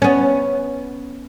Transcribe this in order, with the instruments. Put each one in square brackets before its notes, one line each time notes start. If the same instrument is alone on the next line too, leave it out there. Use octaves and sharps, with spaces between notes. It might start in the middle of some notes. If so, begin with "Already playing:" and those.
[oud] B3 C#4